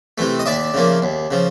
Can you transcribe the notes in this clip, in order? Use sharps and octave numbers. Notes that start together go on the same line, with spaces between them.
C3 E3 A3
D#5
D#2 D5 E5
C#3 F3 A#3
D#2
C#3 F3